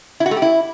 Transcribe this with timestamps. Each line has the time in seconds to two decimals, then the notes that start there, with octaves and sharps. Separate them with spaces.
0.20 E4
0.26 F#4
0.31 A3
0.37 G4
0.42 E4